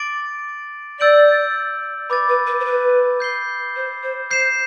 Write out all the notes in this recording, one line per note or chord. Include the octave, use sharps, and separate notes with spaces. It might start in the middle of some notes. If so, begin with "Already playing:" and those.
Already playing: D6 A6 D7 F#7
D5 E6 G6 D7 F#7
B4 B5 D6 A6
B4
B4
C5
B4
G6 C7 G7
C5
C5
C5 G6 C7 E7